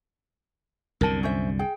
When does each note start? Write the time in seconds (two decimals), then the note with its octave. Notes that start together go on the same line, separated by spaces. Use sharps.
1.01 C2 F#2 D3 A#4 A5
1.23 C#4 C5 E5
1.59 G#4 G5